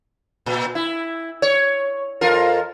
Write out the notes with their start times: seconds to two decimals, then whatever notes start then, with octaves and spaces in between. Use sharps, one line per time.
0.46 A#2
0.75 E4
1.42 C#5
2.21 F2 F4 A#4